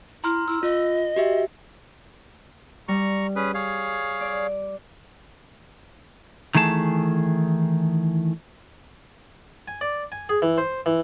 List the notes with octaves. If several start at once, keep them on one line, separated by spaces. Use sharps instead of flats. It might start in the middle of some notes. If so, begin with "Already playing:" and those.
E4 A#5 C6 F6
E4 E6
F4 D#5
F#4 G4 E5
G3 A#5 C#6
C#4 G#4 B4
G#4 C#5 F5
D5
D#3 E3 A3 G#4 A5
G#5
D5
G#5
G#4
E3
C5
E3